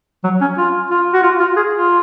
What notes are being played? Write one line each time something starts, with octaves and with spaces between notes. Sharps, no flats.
F#3
C#4
F4
F4
F#4
F4
F4
G#4
F4